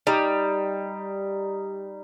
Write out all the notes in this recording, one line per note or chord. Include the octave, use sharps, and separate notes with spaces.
G3 D#4